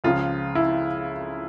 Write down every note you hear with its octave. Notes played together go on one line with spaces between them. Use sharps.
C#2 C#3 F3 F4
E4